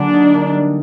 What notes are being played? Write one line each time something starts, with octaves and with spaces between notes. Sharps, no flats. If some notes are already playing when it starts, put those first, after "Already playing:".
Already playing: D3 F#3 A#3 D4 G#4
D#4
A#3
G3